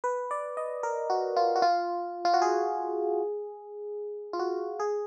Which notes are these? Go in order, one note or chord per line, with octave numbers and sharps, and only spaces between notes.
B4
D5
D#5
A#4
F#4
F4
F#4
F4
F4
F#4
G#4
F4
F#4
G#4